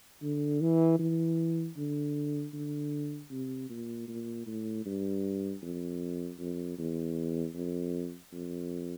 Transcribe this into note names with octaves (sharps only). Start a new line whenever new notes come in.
D3
E3
E3
D3
D3
C3
A#2
A#2
A2
G2
F2
F2
E2
F2
F2